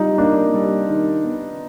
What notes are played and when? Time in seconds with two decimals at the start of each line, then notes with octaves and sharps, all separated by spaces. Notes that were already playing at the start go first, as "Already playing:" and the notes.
Already playing: G3 D#4 F4
0.18 A#3 D4
0.54 G3
0.89 D#3
1.24 B3